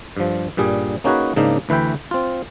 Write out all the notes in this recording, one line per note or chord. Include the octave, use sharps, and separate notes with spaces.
G2 F3
G2 A#2 G3 G#4
A#3 C#4 D#4 F#4 G#4 B4
G#2 C#3 A#3 D4 D#4
D2 E3 B4 E5 G5
C4 F4